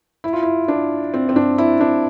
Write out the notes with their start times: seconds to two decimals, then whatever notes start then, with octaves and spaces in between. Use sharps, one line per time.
0.24 E4
0.33 F4
0.42 E4
0.68 D4
1.14 C4
1.29 C4
1.36 D4
1.58 E4
1.80 D4